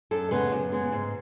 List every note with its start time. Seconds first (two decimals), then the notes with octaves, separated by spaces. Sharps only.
0.11 F#2 A4
0.31 C#3 G#3 B3 B4
0.51 F#2
0.72 C#3 G#3 B3
0.92 G#2